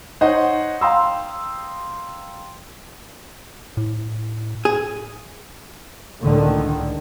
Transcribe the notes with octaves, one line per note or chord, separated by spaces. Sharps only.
D#4 C5 C#5 D#5 F#5
F5 G5 A#5 C6 D#6 E6
A2
G#4
C#2 A2 D3 D#3